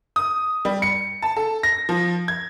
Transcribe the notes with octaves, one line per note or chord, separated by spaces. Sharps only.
D#6
G3
C#7
A5
A4
A#6
F3
G#6